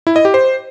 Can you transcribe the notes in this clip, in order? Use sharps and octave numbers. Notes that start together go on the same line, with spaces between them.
E4
D#5
G4
C5